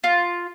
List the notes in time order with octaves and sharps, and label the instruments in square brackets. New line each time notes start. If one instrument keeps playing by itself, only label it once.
[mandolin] F4